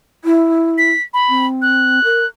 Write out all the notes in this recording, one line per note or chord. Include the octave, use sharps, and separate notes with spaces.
E4
B6
B5
C4
F#6
A#4